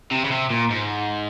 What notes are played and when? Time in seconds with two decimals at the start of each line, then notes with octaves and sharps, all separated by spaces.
0.11 C3
0.25 C#3
0.31 C3
0.50 A#2
0.70 G#2